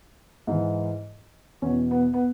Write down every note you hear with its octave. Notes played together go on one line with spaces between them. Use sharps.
G#2 E3
E2 B2 C#4
B3
B3